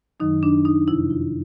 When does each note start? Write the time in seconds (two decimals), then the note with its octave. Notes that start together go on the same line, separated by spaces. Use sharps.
0.20 F#2 D#3 F#3 D#4
0.43 D4
0.65 D#4
0.88 F2 C3 F3 E4
1.10 F4